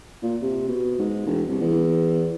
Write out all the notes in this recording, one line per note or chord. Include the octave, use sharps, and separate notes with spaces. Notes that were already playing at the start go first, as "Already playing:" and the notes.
A#2
C3
B2
G#2
E1
C2
E2